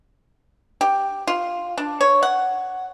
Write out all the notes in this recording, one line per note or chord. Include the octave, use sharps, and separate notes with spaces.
G4
F4
D4
C#5
F#5